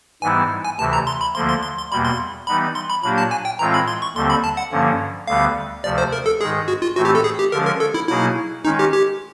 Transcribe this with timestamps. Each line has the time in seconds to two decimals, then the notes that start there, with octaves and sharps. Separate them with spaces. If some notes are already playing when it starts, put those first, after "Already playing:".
0.22 G#2 E3 G3 B3 E4 G#5
0.65 G#5
0.79 D2 C3 E3 A5
0.93 A#5
1.07 C6
1.21 B5
1.35 D2 D3 F3 A#3 C6
1.49 C6
1.63 C6
1.77 C6
1.91 E2 B2 G3 A#3 B5
2.05 C6
2.47 E3 G3 B3 D#4 B5
2.75 C6
2.90 B5
3.03 A#2 F#3 A#3 D4 G4 B5
3.18 A5
3.31 G#5
3.45 G5
3.59 A2 E3 G#3 C4 F4 A#5
3.74 B5
3.88 C6
4.02 C#6
4.15 D#2 D3 G3 C4 C6
4.30 B5
4.44 A5
4.57 F#5
4.72 G2 D3 F3 A#3 C#4
5.27 D2 D3 G3 B3 F5
5.84 D2 C3 F3 D5
5.98 C5
6.13 A#4
6.26 A4
6.40 G#2 D#3 G#3 G#4
6.68 F#4
6.82 F4
6.96 A2 E3 A3 C4 F#4
7.05 G4
7.15 A4
7.24 G#4
7.39 G4
7.52 D3 F3 G#3 C#4 A#4
7.66 A#4
7.80 A4
7.94 E4
8.09 B2 F#3 A#3 D#4 E4 G#4
8.65 D#3 G#3 C#4 D#4
8.79 G4
8.93 G4